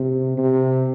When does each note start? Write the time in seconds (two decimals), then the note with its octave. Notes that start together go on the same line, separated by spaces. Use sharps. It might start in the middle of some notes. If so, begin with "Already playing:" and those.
Already playing: C3
0.37 C3